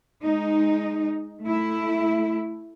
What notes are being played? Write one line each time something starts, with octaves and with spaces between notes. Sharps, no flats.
G#3 D#4
A3 E4